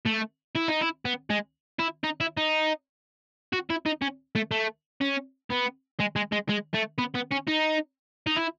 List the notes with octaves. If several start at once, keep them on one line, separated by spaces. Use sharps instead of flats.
A3
E4
D#4
E4
B3
G#3
E4
D#4
E4
D#4
F#4
E4
D#4
C#4
A3
A3
C#4
B3
G#3
G#3
G#3
G#3
A3
B3
B3
C#4
D#4
D#4
E4